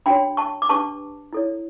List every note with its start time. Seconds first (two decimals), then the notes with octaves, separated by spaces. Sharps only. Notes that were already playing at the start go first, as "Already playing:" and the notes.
0.06 D4 F#4 C#5 G5 B5
0.37 A5 C#6
0.62 D6
0.69 D4 G4 B4 A5 C#6
1.33 E4 A4 C#5